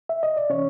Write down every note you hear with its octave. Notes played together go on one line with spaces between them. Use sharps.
E5
D#5
D5
C3 E3 C#4 C#5